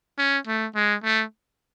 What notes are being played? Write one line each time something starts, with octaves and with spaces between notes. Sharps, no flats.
C#4
A3
G#3
A3